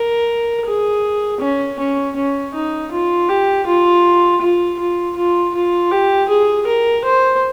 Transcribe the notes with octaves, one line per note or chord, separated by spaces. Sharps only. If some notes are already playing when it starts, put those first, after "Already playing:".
Already playing: A#4
G#4
C#4
C#4
C#4
D#4
F4
G4
F4
F4
F4
F4
F4
G4
G#4
A#4
C5